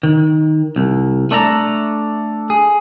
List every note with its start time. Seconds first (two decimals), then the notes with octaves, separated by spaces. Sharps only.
0.03 D#3
0.76 C2
1.31 A3 D4 A4 A#5
2.50 G#4